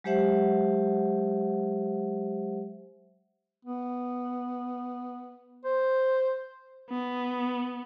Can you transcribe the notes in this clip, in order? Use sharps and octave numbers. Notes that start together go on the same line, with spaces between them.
F#3 G#3 G4 C5 E5 F#5
B3
C5
B3